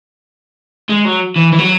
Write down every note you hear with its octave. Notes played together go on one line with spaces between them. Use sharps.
G#3
F#3
E3
E3
F#3